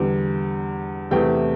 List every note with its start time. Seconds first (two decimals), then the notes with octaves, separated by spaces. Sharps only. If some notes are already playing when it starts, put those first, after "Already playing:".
Already playing: E2 D3 G3
1.11 E2 C3 A3 G5